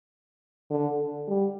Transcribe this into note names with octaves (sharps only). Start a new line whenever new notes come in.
D3
G3